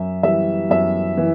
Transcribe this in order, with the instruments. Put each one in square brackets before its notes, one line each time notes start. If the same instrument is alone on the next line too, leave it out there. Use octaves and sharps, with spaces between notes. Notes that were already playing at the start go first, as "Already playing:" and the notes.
Already playing: [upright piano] F#2 E5
E3 G3 E5
F#2 E5
E3